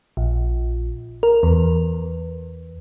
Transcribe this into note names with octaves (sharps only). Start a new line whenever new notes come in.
A#1
A#4
E2